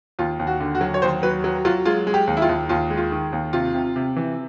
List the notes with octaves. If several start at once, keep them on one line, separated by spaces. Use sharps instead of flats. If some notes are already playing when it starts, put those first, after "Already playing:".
D#2 F4
D#2
F#4
D3
F#4
F#3
C#5
D#2 C5
F#3 B4
F#3
F#3 F4
G#3 F4
G#3
G4
D#2
E4
F4
D#2
D#2 F4
G#3
F4
D#3
D#2
C3 F4
C3
C3
E3